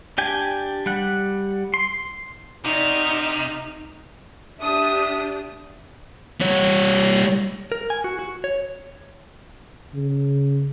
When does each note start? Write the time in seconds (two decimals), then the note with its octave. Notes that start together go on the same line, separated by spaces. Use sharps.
0.18 D4 G4 G5 G#5
0.86 G3 F#5
1.74 C6
2.65 C3 D#4 F#4 D5 E5 F6
4.61 D4 G4 E5 D#6
6.41 G3 C#5
7.72 A#4
7.90 G#5
8.04 F#4
8.19 F#4
8.44 C#5
9.94 C#3